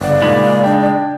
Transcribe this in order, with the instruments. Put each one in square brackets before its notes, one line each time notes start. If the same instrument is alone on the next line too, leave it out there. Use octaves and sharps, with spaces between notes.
[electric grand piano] G1 F#5 [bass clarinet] C#3 [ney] D5
[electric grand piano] A#2 D#4 [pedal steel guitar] G#3 B5
[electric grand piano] D4 G5